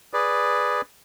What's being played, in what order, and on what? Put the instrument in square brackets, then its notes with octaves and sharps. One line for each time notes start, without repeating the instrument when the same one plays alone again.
[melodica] G#4 B4 D5